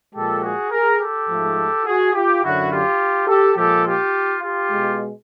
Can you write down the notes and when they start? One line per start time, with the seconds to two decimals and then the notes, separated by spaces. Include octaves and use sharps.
0.14 A#2 F3 G#3 G4 A4
0.42 F#4 G#4
0.71 G#4 A#4
1.00 G4 A4
1.28 G#2 F3 A3
1.86 F#4 G#4
2.14 F4 G4
2.42 F#2 D3 F#3 E4 F#4
2.71 F4 G4
3.28 G4 A4
3.57 A#2 F3 G#3 G4 A4
3.85 F4 G4
4.42 F4 G4
4.71 B2 G#3